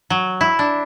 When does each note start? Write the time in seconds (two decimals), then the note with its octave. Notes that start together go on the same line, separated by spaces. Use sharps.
0.10 F#3
0.41 E4
0.59 D4